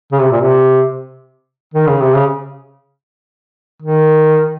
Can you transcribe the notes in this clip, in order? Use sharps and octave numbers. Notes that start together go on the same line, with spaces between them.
C#3
C3
A#2
C3
D#3
C#3
C3
C#3
D#3